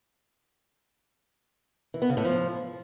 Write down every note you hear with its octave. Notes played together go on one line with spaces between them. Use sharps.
E3
B3
C#3
A2
F3